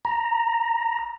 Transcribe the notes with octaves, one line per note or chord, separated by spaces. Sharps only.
A#5